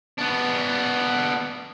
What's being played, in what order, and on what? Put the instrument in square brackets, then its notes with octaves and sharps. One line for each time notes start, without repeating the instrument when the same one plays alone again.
[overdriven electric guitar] B3 D4